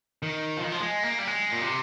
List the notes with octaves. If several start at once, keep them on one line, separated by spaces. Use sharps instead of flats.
D#3
F3
D#3
F3
G#3
A#3
G3
G#3
A#2
C3